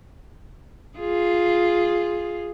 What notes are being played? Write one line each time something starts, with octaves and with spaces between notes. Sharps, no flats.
F4 G#4